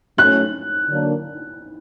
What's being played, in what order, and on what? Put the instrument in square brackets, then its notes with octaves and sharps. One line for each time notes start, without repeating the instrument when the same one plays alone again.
[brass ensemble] F#3 A3 C#4 [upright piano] F#6
[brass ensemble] D3 F#3 A#3 D4